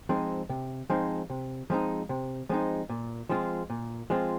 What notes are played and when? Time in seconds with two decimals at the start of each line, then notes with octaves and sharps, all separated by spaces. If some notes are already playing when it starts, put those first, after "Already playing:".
0.09 F3 G#3 C4 D#4
0.49 C3
0.90 F3 G#3 C4 D#4
1.30 C3
1.70 F3 G#3 C4 D#4
2.09 C3
2.49 F3 G#3 C4 D#4
2.89 A#2
3.29 F3 G#3 C4 F4
3.70 A#2
4.10 F3 G#3 C4 F4